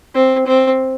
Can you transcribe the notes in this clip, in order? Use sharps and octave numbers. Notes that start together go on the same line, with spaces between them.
C4
C4